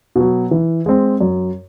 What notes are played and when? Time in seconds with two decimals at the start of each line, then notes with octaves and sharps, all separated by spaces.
0.16 B2 F#3
0.51 E3
0.86 G#3 C4
1.21 F#2